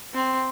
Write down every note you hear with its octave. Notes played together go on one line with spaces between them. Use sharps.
C4